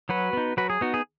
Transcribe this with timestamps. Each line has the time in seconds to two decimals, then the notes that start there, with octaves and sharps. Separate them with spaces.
0.09 F#3 F#4 B4
0.33 B3 D#4
0.57 F#3 F#4 B4
0.70 G#4
0.81 B3 D#4 F#4
0.94 G#4